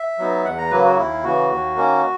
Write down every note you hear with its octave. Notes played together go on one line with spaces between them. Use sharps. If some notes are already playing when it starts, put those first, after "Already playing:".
Already playing: E5
F#3 B3 D#4
E2 F#5
A#5
C#3 F#3 A#3 B4
F#4
D#2 E4
C#3 E3 F#4
D#2
D#3 A#3 C#4